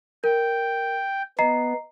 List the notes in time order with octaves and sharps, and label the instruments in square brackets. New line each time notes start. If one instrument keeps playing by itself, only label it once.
[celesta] A#4 [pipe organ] G5
[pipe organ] B3 [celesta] D#5 A#5 C7